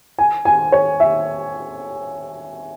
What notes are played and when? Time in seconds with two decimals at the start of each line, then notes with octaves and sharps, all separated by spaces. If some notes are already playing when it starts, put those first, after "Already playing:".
0.19 G#5
0.45 G#5
0.72 C#5
1.00 E5